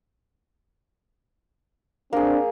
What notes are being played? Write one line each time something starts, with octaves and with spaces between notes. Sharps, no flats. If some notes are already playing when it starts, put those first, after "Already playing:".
A#3 C4 D4 G#4